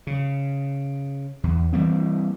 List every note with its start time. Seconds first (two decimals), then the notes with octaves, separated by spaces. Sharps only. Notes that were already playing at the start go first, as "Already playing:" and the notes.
0.07 C#3
1.43 E2
1.72 E3 G3 A#3 C4